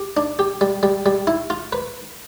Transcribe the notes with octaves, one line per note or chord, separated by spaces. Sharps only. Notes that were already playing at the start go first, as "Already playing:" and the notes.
Already playing: G4
D4
G4
G3
G3
G3
E4
F4
B4